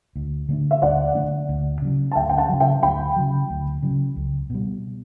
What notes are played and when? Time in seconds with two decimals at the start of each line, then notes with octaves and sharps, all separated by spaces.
0.16 D2
0.49 D3 A3 D4
0.71 E5
0.82 D2 D5 F#5
1.15 D3 A3 D4
1.49 D2
1.82 C#3 F#3
2.11 A5
2.15 D2 E5 G5
2.29 G5
2.38 F#5 A5
2.49 C#3 F#3
2.60 E5 G5
2.83 D2 G5 B5
3.16 C#3 F#3
3.50 D2
3.83 C#3 F#3
4.16 C#2
4.50 B2 G3